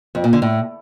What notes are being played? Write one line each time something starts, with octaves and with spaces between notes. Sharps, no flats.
F2
A#2
D3
A2